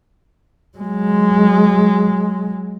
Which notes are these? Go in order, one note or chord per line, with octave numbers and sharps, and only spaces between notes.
F#3 G#3